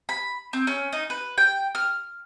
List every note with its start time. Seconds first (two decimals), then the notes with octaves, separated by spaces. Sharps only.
0.09 B5
0.53 C4
0.67 C#4
0.93 D#4
1.10 B4
1.38 G5
1.75 F6